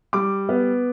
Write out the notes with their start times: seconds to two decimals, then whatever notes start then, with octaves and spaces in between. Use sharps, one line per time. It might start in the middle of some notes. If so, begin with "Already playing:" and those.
0.13 G3 D6
0.49 B3